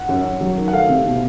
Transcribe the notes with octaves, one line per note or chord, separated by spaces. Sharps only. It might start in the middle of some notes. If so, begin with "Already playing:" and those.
Already playing: F#5
F#2
F#2
F#3
D#3
F#5
A3 F5
C3
B2